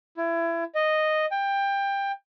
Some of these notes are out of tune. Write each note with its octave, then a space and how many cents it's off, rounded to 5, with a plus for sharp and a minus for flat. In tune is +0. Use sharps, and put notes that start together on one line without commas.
E4 +25
D#5 -5
G5 +20